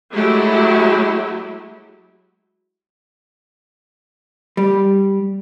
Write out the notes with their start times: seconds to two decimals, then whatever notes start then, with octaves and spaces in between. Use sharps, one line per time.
0.13 F#3 G#3 A3 E4 G4
4.57 G3